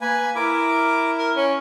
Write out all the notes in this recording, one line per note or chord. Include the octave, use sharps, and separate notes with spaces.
A#3 B4 G#5
E4 A#4 D6
A#4
C#4